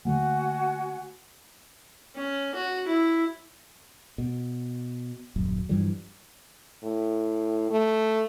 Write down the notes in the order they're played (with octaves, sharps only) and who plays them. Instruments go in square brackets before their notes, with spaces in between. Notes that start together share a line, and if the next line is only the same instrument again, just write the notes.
[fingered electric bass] D3 A3 A#3 [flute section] F#4 F#5 G#5
[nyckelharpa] C#4
F#4
E4
[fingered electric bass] B2
D#1 F#2
G2 E3 F3 G3
[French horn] A2
A3